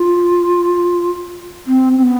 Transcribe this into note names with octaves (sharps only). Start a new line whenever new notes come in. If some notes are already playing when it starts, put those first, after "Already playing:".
Already playing: F4
C4
C4
B3